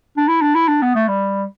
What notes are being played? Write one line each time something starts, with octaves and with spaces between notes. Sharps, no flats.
D4
E4
D4
E4
D4
B3
A3
G3